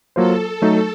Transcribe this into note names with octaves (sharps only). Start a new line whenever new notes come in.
F#3 A#3 F4 A4 C5
F#3 A3 D#4 A4